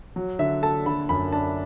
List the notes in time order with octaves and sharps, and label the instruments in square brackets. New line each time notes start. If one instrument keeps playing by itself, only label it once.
[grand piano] F#3
[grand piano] D3 [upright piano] E5
[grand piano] A4 [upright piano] A5
[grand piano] D3 [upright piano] B5
[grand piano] F#2 [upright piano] B5
[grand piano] D4 [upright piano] A5